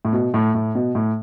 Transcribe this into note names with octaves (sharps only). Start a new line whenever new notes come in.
A2
B2
A2
A2
B2
A2